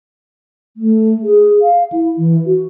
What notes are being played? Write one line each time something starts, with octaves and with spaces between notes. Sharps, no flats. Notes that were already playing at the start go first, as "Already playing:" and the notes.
A3
G#4
F5
E4
E3
F#4